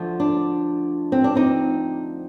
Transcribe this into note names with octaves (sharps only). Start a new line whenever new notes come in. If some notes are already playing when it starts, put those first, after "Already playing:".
Already playing: D2 D3 F3
D4
C4
D4
C4 D#4